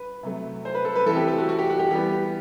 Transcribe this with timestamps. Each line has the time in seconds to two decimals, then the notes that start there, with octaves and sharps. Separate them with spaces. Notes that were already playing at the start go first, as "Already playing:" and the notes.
Already playing: B4
0.23 C3 F#3 A3
0.65 C5
0.74 B4
0.85 A4
0.95 B4
1.06 E3 A3 C4 A4
1.16 G4
1.28 A4
1.38 F#4
1.49 F#4
1.59 G4
1.70 F#4
1.79 G4
1.90 E3 G3 B3 G4